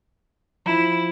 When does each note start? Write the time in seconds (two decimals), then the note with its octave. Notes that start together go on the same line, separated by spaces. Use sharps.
0.66 F3 E4